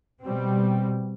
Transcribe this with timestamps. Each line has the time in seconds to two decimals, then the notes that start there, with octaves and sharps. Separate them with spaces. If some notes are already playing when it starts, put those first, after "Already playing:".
0.23 B2 G3 C4